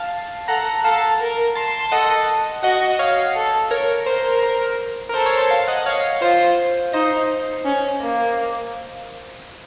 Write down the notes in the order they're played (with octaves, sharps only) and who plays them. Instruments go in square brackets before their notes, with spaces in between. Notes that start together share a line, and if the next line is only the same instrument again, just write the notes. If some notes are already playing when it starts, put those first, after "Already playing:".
Already playing: [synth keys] F5 A5
[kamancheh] A4 [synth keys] F#5 A#5
[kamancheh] A4 [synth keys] F5 A5
[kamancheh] A#4
[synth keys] A5 C6
A5 C6
A5 C6
[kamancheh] A4 [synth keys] D#5 F#5
[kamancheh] F#4 [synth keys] D#5 F#5
[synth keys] C#5 F5
[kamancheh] A4
[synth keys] A#4 C#5
[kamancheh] A#4 [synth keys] C5
[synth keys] A#4
A#4
[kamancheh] A4 [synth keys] C5
[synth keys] A#4 C#5
A5 C6
F5 A5
D#5 F#5
C#5 F5
[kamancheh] F4 [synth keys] C5
[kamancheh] D#4 [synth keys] C5 D#5
[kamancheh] C#4
A#3